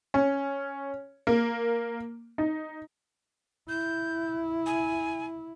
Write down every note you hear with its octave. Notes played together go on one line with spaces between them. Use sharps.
C#4
A#3
D#4
E4 G6
G#5